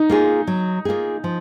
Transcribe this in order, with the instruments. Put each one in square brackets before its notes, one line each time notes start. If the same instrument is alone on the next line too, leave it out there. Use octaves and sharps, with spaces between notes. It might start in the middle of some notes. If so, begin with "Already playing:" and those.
Already playing: [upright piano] D#4
[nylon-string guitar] A#3 F4 G#4
F#3
A#3 F4 G#4
F3